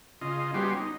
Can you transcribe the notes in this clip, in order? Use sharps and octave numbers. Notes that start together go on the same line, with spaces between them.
C#3 F4 D#5
G3 B3 C#4 F#4 G4 C6
D#4